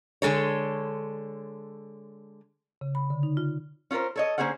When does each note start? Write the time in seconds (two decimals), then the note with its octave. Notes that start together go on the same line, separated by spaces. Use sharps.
0.22 D3 G#3 A4 C#5
2.81 C#3
2.95 B5
3.10 D3
3.23 D#4
3.37 F4
3.91 C#4 F4 A4 A#4 C5
4.16 A4 C#5 D#5
4.38 D3 A#3 C#4 G#4 C5 F#5